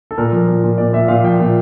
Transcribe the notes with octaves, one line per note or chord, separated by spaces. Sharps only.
A4
A#2 A#4
F3
A#2
A#2
A#2 D5
A#2 E5
A#2 F5
F3 G5
A#2